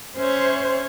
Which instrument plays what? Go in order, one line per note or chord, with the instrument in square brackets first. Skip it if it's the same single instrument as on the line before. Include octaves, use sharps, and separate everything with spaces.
[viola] C#4 C#5 [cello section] C5 E5